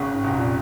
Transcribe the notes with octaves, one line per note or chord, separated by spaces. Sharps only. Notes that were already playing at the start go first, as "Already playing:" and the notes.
Already playing: G#1 C#3
G#2
F1
G#2
A#2